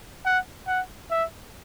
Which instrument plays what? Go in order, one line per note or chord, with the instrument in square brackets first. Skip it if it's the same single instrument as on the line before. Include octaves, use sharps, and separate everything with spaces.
[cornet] F#5
F#5
E5